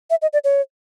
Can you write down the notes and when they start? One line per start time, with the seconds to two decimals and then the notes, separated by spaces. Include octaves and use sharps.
0.10 E5
0.22 D#5
0.33 D5
0.44 C#5